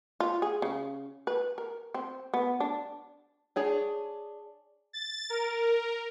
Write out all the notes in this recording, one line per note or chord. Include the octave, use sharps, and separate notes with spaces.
F4
G#4
C#3
B4
A#4
C4
B3
D4
D4 G#4 C#5
A6
A#4